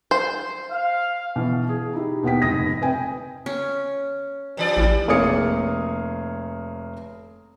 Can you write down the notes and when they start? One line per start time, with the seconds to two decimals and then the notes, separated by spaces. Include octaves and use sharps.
0.11 C5
0.71 F5
1.36 B2 E3
1.69 G#4
1.93 D#4 E4 G4
2.23 D#2 B2 B3 G5 B6
2.42 F1 G#2 D#6 A#6
2.81 C3 B4 G5 G#5
3.46 C#4
4.57 G2 E3 D5
4.77 A1 E4
5.08 F1 A#3 G#4 C#5 D#6 C#7